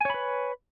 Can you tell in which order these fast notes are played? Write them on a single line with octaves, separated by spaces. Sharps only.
G#5 C#5 B5 B4